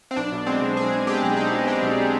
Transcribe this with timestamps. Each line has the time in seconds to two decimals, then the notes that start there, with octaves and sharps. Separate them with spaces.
0.11 C4
0.16 B1 D4
0.32 B2
0.46 G#3 C4
0.61 B1
0.77 B1 G#4
0.92 B2
1.07 G#3 G4
1.22 B1
1.37 B1 D#4
1.52 B2
1.67 G#3 D4
1.82 B1